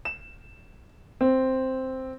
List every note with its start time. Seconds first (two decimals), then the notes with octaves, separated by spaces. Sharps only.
0.05 E7
1.21 C4